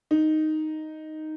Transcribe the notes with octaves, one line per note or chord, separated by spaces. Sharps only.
D#4